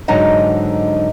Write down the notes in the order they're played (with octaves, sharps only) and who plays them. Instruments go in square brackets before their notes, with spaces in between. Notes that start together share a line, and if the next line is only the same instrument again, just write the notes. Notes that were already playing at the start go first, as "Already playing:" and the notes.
[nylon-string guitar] G#2 D3 F#3 D#4 D#5 F#5